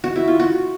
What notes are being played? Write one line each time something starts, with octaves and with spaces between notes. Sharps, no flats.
F#4
E4
F4
F#4